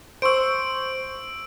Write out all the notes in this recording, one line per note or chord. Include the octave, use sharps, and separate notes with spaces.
C5 C6 C#6 E6 D7